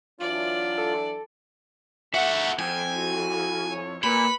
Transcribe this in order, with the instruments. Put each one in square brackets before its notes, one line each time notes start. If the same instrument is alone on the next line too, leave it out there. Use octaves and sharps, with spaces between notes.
[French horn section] E3 F#3 D4 [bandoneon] F4 [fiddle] D5
[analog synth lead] A4
[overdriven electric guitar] F#4 A4 [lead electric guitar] E5 [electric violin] F#5
[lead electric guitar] F2 [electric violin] G5 [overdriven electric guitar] G#5
[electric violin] E4 F#4
C#5
[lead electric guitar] A#2 [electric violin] B4 C#7 [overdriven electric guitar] B5